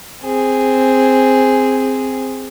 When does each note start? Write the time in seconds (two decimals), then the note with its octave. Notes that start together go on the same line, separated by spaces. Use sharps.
0.23 C4 G#4